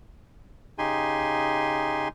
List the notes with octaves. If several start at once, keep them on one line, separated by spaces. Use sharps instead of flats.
C#3 D#4 G4 G#5 C6